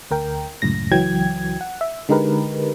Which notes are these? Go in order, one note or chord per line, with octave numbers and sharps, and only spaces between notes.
D2 A#4 G5
C#2 F#2 A2 A#6
C#2 E3 F#3 G5 G#6
F#5
E5
D3 G#3 D#4 G4 A#4 B4